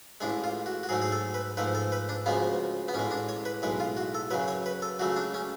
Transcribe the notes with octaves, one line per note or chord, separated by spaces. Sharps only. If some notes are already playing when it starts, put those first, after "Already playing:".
A1 A2 G#3 D4
F4
F#4
F#4
G#2 F#3 A3 G#4
G#4
A4
B4
G#2 F3 A3 B4
A4
B4
D4
D2 C#3 F3 G#3 B3
B3
A1 A2 G#3 C#4
D4
C#5
B4
B1 A2 G#3 B4
F4
F#4
A4
F#2 C#3 F#3 B4
C#5
B4
A4
C#2 C#3 F#3 A3 F#4
D4
C#4